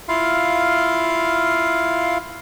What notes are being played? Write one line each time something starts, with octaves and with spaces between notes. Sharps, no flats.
E4 F4 F5